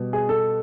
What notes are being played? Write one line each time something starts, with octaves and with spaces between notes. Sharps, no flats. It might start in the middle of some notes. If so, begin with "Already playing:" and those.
Already playing: B2 G3
G#4
A4